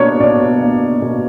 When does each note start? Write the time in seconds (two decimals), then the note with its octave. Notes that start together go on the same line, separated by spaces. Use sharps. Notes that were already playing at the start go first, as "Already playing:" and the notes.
Already playing: B2 A#3 D4 C#5
0.20 B2 D5
0.62 A#3 D4
1.02 B2